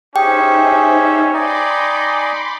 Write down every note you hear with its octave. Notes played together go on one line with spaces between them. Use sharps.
C#4 D#4 G4 G#4 C5 E5 G5
D#4 D5 G#5 B5 C6 D6